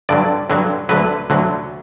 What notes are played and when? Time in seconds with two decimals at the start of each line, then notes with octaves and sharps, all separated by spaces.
0.09 G2 D3 F#3 D5
0.50 G2 D3 F#3
0.89 D2 D3 F#3 B4
1.30 D2 D3 F#3